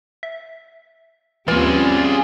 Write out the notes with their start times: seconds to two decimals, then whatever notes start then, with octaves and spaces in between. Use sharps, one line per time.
0.23 E5
1.48 D#2 E3 G3 C4 C#4 F4 G#4 D5